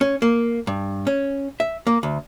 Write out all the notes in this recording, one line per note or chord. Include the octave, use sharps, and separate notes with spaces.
C#4
A#3
G2
C#4
E5
A#3
D2